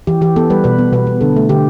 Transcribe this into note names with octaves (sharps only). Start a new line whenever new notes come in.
E3 G4
E3 G4
B3 A4
G3 B4
B2 B4
B3
B2 B4
B3
D3 A4
A3
D3 G4